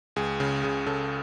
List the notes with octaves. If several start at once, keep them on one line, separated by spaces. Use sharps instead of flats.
C#2 G#4
C#3
C#3 G#4
C#3 A4